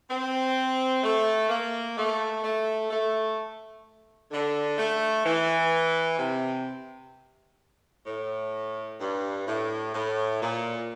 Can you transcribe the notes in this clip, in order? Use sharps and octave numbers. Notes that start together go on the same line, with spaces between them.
C4
A3
A#3
A3
A3
A3
D3
A3
E3
C3
A2
G2
A2
A2
A#2